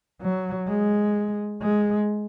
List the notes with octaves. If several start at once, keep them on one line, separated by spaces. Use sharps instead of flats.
F#3
G#3
G#3